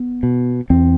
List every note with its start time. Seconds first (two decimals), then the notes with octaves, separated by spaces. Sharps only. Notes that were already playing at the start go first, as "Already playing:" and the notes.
Already playing: B3
0.23 B2
0.70 E2 C4